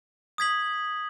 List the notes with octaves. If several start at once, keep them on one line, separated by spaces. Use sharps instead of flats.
D#6 G#6 B6 F#7